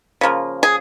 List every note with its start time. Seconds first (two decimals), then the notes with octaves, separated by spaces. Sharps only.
0.21 C#3 F3 A#3
0.63 G#4